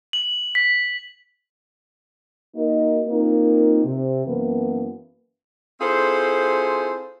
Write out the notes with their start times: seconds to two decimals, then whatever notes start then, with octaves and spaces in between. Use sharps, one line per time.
0.13 F#7
0.55 B6
2.55 A#3 D#4 F#4 A#4 D#5
3.08 A#3 C4 D#4 F4 A#4
3.84 C3
4.26 F#2 E3 A#3 B3
5.81 C4 E4 F4 G#4 A4 C5